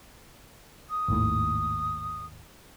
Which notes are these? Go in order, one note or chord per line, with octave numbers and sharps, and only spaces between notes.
D#6
G#1 D#2 A2